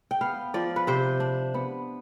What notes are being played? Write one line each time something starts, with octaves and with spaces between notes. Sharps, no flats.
G5
B3 F5
F3 D5
B4
C3 C5
D4
B3